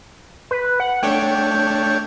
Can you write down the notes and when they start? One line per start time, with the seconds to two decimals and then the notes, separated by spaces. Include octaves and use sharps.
0.51 B4
0.80 F#5
1.03 A3 D4 C#5 G5